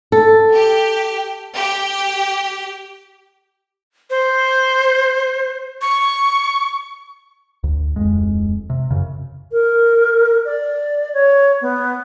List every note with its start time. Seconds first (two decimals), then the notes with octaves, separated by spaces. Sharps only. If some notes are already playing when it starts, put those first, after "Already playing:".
0.12 A4
0.53 G4
1.55 G4
4.10 C5
5.81 C#6
7.64 D2
7.96 D1 F2 G#3
8.70 C3
8.91 F#2 C#3
9.52 A#4
10.45 D5
11.14 C#5
11.61 B3